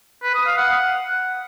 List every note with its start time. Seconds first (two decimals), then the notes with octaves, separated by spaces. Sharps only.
0.24 B4
0.35 D#6
0.46 F5
0.58 F#5